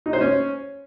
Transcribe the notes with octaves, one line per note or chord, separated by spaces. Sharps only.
D#4
C5
C#4